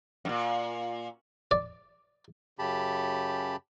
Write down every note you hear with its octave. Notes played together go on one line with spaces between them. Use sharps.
F#2 A#2
D5
F#2 C#3 G4 A5 B5